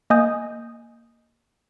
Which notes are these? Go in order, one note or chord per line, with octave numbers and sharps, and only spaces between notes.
A#3 D#5 G#5 D#6 G6